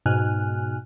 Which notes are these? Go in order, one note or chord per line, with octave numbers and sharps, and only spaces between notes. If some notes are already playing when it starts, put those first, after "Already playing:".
G#2 B2 G#5 F6 F#6